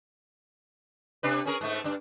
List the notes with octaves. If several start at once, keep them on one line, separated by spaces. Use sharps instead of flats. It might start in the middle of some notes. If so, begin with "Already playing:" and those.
C3 D4 B4
C#4 G#4 A#4
G#2 A3
G2 D4